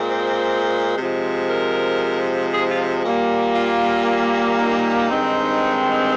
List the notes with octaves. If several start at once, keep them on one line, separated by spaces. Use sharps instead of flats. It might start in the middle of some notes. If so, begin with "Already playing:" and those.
Already playing: A#2 G#3 C4
C5
C3 F3 G#3
A#4
G#4
F4
A#2 G3 A#3
F4
D#4
G2 D#3 G#3 C4